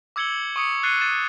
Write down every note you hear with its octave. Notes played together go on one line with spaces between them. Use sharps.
D6 E6 G#6 C#7 F#7 G7
C#6 D#6 C#7
F#6 A6 C7 C#7 D#7 G7
A6 D#7 E7
F#6